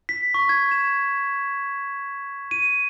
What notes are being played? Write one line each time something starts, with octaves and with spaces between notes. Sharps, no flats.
B6
C#6
G#6
E7
D#7